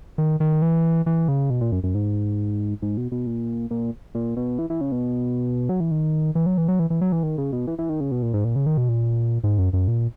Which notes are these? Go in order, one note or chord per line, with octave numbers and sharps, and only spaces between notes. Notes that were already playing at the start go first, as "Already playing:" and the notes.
D#3
D#3
E3
E3
C#3
B2
A#2
F#2
F#2
G#2
G#2
B2
B2
A#2
A#2
A#2
B2
E3
E3
C#3
B2
F#3
E3
D#3
E3
F#3
E3
F#3
E3
E3
F#3
E3
D#3
C#3
B2
E3
E3
D#3
C#3
B2
A#2
G#2
A#2
C#3
D#3
B2
A#2
G#2
F#2
F#2
A#2